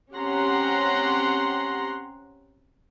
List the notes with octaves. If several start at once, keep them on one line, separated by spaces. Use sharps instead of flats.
C4 C#4 G4 F#5 A#5 C6